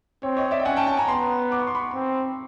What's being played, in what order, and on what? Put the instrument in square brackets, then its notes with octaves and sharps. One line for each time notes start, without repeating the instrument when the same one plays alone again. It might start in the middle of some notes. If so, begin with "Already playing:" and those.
[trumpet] C4 [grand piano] C#5
[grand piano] C#5 D#5
D5 E5
G5
[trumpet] C#4 [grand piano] F#5 G#5
[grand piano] G5 A5
G5 A5
G#5 A#5
[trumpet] B3 [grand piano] A#5 C6
[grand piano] D6
C#6
C6
B5 C#6
[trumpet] C4